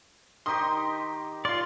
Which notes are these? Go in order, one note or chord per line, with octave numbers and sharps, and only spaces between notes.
D#3 D#4 G4 C6 D#6
F4 D5 F5 C6